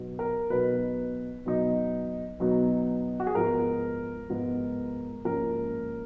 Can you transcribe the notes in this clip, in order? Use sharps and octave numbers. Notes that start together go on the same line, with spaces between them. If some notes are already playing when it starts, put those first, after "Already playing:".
Already playing: B2 F#3 B3 D#4
A#4
B2 F#3 B3 D#4 B4
B2 F#3 B3 D#4
B2 F#3 B3 D#4
F#4
G#4
G#2 F3 B3 F4 A#4
G#2 F3 B3 F4
G#2 F3 A#3 C#4 A#4